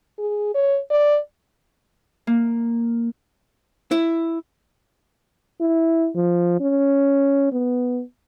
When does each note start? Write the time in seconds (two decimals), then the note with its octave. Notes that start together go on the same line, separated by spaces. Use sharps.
0.18 G#4
0.55 C#5
0.91 D5
2.27 A#3
3.91 E4
5.61 E4
6.15 F3
6.60 C#4
7.52 B3